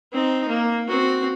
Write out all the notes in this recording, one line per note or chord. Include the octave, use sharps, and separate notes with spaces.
C4 D#4
A#3
C4 F#4